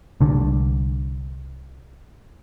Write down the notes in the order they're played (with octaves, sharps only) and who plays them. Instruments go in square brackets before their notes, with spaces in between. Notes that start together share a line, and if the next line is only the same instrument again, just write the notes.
[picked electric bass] C2 D3